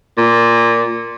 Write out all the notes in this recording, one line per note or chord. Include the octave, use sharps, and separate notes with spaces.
A#2